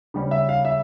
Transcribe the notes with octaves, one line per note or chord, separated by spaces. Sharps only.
C#3 G3 C#4
E5
F5
E5